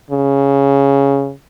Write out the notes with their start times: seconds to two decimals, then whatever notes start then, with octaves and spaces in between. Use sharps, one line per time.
0.11 C#3